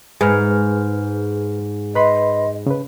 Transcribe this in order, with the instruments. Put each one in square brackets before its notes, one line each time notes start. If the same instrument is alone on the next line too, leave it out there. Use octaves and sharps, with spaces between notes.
[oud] G#2 [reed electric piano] G#4 B4 F6
[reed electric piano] B4 B5 C6 [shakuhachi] D#5
[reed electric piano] C#3 B4